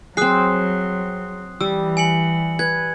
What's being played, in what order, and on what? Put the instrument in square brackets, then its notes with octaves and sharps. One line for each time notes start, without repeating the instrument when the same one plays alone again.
[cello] F#3 [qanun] C4 G#4 [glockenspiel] D#6 F#6 C7
[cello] E3 [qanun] G3 [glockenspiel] E6
[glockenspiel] G#5 C#7 F#7
[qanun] B4 [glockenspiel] G#6